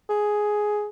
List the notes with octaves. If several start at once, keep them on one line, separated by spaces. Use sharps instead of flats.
G#4